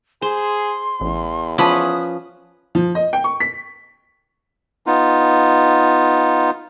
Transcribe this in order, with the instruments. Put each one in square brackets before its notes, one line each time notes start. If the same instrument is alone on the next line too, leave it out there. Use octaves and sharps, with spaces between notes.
[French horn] G#4 [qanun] C5 [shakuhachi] C6
[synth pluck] A1 [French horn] E2
[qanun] F3 C#4 B4 [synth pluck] A5 B5 D6 [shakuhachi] D#6
[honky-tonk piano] F3
D#5
G5
C#6
B6
[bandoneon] B3 D#4 F4